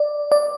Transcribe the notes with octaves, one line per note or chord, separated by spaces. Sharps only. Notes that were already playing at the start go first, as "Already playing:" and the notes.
Already playing: D5
D5